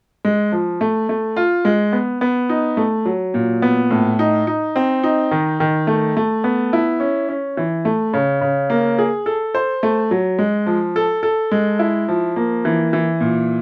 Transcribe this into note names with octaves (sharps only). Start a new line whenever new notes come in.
G#3
F3
A3
A3
F4
G#3
B3
B3
D#4
A3
F#3
A#2
B3
A2
D#4
D#4
C4
D#4
D#3
D#3
A3
A3
B3
E4
C#4
C#4
E3
A3
C#3
C#3
A#3
G#4
A4
C5
A3
F#3
G#3
F3
A4
A4
G#3
E4
F3
A#3
E3
E3
A#2